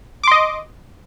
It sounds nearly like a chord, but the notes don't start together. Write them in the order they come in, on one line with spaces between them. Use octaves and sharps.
D6 C6 D#5